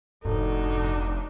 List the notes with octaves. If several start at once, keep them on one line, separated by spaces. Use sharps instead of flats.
F1 G#2 D4 D#4 F#4 A4